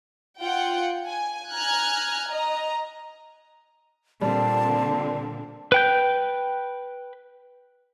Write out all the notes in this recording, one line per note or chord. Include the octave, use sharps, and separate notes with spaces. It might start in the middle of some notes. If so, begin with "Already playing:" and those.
F4 F#5 G5
G#5
G#5 A#5 F6 F#6 G#6
D#5 A#5
A#2 D3 G3 C4 A5
B4 G5 G6